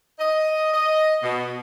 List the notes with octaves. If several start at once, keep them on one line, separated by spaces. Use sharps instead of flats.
D#5
D#5
B2